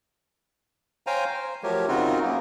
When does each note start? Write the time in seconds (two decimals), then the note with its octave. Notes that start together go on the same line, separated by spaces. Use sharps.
1.07 C5 C#5 F5 G5 G#5 A#5
1.34 C5
1.63 F3 F#3 A3 G4 A#4 C#5
1.88 C#3 C4 D#4 F4 F#4 A#4
2.22 F#2 A#3 B3